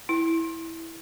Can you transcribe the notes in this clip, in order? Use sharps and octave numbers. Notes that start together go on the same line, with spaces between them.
E4